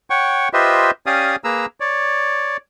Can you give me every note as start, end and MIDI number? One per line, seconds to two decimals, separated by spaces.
0.10 0.49 73
0.10 0.49 78
0.10 0.49 79
0.10 0.49 85
0.53 0.91 65
0.53 0.91 67
0.53 0.91 71
0.53 0.91 72
0.53 0.91 75
0.53 0.91 76
1.06 1.36 61
1.06 1.36 67
1.06 1.36 74
1.06 1.36 77
1.06 1.36 80
1.06 1.36 87
1.44 1.66 58
1.44 1.66 68
1.44 1.66 71
1.44 1.66 82
1.44 1.66 88
1.80 2.57 73
1.80 2.57 74